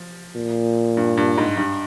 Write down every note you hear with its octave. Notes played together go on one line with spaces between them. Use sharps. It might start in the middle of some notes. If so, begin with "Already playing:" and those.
Already playing: F3
A#2
G2
G2
G#2
G2